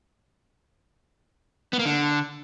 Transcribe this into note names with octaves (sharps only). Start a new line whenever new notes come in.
B3
A#3
D3